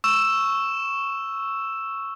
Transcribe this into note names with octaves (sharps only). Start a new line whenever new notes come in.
C#6 E6 E7